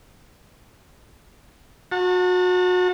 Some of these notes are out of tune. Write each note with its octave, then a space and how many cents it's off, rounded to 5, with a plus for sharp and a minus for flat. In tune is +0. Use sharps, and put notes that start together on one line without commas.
F#4 -30 A5 +35